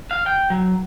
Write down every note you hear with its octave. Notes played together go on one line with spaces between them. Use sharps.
F5
G5
F#3